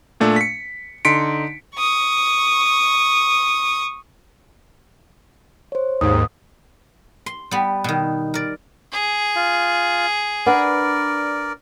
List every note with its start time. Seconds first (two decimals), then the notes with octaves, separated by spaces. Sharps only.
0.20 A#2 A3 D4
0.36 B6 C#7
1.05 D3 D#4 C6 B6 C#7 D7
1.76 C#6 D#6
5.72 C5 C#5
6.01 D#2 G#2 D#6
7.26 C6
7.51 G3 B3
7.84 B2 D#3
8.34 A#4 D5
8.93 G#4
9.35 F4
10.46 D4 A#4 B4 D5 F#5